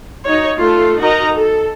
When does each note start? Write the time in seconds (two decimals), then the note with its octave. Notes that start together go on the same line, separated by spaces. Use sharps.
0.25 D#4 F#4 C#5
0.57 A3 F4 A4
1.00 D#4 F#4 A#4 D#5 A#5
1.36 A4